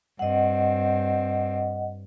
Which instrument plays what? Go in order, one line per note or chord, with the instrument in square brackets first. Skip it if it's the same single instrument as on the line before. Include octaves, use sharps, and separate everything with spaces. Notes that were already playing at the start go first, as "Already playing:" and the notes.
[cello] G2 C4 [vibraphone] D#5 F#5